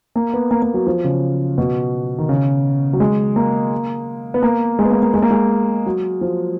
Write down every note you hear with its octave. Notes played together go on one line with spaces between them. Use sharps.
A#3
B3
A#3
A#3
F#3
F3
C#3
B2
D#3
C#3
F#3
G#3
A#3
B3
A#3
G#3
B3
A#3
A#3
G#3
A#3
G#3
F#3
F3